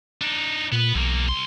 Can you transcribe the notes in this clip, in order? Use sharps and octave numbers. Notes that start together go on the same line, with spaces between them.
D4 D#4
A#2 B3 B4
B1 E2 A#3
C2 C6